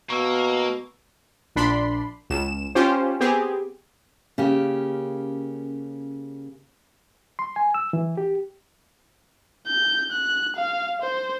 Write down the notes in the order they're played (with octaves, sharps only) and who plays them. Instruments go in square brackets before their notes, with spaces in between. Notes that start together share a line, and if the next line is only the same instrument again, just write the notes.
[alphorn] B2 [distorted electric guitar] A#3 [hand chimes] C#6 E6
[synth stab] A#1 D4 B5 C6
C#2 E7
C#4 F4 G4 C5
B3 C4 G4 G#4
[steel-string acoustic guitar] C#3 A#3 C#4 G4
[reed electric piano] C6
G#5
E6
E3
G4
[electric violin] G6
F#6
F5
C5